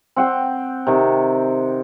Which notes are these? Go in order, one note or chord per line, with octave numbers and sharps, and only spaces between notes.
C4 F#5 G5
C3 D#3